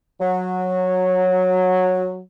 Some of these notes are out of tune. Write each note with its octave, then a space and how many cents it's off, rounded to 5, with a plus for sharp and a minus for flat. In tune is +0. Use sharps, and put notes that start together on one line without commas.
F#3 -10